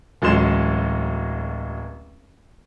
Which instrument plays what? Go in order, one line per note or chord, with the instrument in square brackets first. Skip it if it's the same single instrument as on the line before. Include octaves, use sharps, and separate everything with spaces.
[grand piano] D1 A1 F#3 G#3 C6 E7